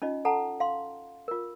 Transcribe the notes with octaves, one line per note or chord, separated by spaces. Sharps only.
C#4 D#4 F4 D#5
A4 F#5 A5 A#5
F5 C6
F4 A#4